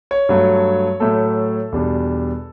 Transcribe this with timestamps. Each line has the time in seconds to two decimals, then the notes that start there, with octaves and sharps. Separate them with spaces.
0.11 C#5
0.29 G2 F#3 A3
1.00 A2 F#3 A3 A4
1.72 E2 B2 G3 D4